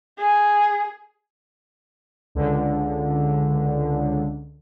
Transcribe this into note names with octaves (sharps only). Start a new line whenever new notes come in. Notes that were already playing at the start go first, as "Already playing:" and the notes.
G#4
C#2 D3